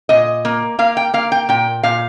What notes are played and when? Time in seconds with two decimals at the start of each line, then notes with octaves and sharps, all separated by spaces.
0.09 A#2 D#5
0.45 A#3
0.79 A#3 F5
0.97 G5
1.14 A#3 F5
1.32 G5
1.49 A#2 G5
1.83 A#2 F5